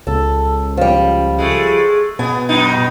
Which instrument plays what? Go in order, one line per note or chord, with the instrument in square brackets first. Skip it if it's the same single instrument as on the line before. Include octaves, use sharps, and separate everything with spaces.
[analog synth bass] C#2 [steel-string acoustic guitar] A4
[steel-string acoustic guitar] F3 G3
[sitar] G#3 A3
[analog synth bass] B2 [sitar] B3 [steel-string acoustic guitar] G#5
[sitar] F#2 B3 D#4